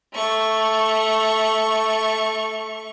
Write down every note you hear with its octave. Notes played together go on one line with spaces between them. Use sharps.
A3 C#6